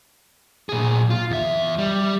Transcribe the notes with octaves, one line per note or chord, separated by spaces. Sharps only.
A#2 G#4
F4
E2 E5
G3